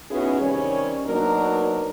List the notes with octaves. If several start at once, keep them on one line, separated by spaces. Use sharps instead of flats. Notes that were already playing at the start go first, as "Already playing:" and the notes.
B3 C#4 D#4 E4 F#4 G#4
C3 D#3 G3 C#4 C#5
B2 F#3 A#3 D4 D#4 A#4